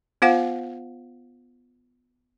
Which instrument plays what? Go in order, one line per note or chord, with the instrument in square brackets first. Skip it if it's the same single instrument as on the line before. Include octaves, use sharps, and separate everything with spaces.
[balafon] B3 F4 C5 F5 F#5